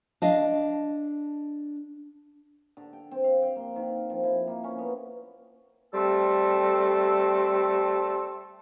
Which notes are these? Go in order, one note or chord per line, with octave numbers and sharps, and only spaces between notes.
D4 D#5 F5
D3
G5
C4
F5
G5
A#3
D#3
F3
E4
A#3
C#4
B3
G3 A3 C4 A4